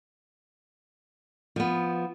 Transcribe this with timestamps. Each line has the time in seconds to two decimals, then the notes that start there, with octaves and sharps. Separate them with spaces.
1.56 F3 B3